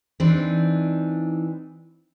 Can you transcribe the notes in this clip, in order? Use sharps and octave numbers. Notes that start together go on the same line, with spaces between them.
E3 C4 D4 D#4